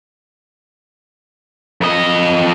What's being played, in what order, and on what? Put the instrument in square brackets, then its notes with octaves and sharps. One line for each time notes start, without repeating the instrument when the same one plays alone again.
[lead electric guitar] F2 D#5